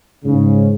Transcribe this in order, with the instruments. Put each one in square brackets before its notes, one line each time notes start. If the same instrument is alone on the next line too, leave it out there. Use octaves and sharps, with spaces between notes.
[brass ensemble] G#2 C#3